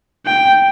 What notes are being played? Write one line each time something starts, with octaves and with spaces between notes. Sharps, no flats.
G5